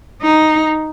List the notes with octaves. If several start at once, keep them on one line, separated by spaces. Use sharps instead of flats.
D#4